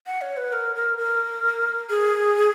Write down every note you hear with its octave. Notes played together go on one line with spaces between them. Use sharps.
F#5
C#5
B4
A#4
A#4
A#4
G#4